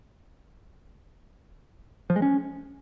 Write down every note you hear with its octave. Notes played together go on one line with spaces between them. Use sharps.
F3
G#3
C#4